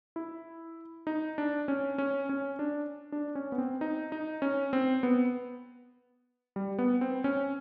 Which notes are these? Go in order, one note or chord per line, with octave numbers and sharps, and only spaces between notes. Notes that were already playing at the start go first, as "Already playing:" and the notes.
E4
D#4
D4
C#4
C#4
C#4
D4
D4
C#4
B3
C4
D#4
D#4
C#4
C4
B3
G3
B3
C4
C#4